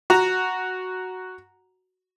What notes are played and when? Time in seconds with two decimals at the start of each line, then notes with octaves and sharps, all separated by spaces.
0.10 F#4 A#5